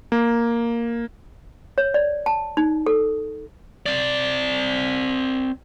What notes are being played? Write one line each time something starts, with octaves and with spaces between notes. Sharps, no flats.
A#3
C#5
D5
A5
D#4
A4
C4 D5